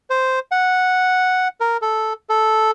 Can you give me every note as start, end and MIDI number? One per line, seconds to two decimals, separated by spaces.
0.10 0.39 72
0.51 1.48 78
1.60 1.77 70
1.82 2.13 69
2.29 2.71 69